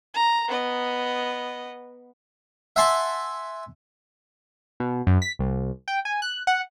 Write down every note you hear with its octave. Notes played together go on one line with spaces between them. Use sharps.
A#5
B3 D#5
E5 F#5 G#5 A5 C6
B2
F#2
B6
C2
G5
G#5
F#6
F#5